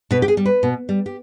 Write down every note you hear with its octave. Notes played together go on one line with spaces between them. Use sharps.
B2 B4
G4
G#4
G3
B4
B2
G3
G4